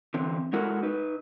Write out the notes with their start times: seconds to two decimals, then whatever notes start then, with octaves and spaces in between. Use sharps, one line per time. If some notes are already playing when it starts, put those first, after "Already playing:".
0.14 D3 E3 C4
0.53 G#3 E4 F#4 A4 A#4
0.83 D#4 B4